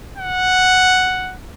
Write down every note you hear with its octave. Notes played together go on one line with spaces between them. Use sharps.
F#5